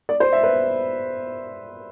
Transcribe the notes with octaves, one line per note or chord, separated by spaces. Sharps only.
D5
C5
E5
B4